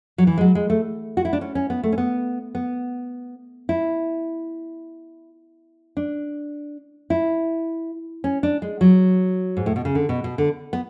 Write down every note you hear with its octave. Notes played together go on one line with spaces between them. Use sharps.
F#3
E3
G#3
F#3
G#3
A3
F#4
E4
D4
C#4
C#4
B3
A3
C#4
B3
B3
E4
D4
E4
C#4
D4
G#3
F#3
G#2
A2
B2
C#3
D3
B2
B2
D3
B3